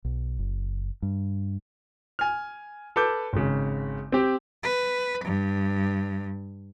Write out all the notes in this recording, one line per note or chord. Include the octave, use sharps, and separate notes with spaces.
B1
F#1
G2
G#5 F6
A4 B4 A5 D6 G6
G#1 C#3
C4 G4
B4
G2